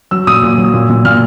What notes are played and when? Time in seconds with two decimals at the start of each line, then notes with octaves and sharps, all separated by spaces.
0.11 F#3 E6
0.27 A#2 D#6
0.43 A#2
0.58 F#3
0.74 A#2
0.90 A#2
1.05 A#2 F6